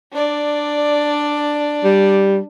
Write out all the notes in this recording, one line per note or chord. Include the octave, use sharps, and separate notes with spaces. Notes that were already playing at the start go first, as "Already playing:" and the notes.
D4 D5
G3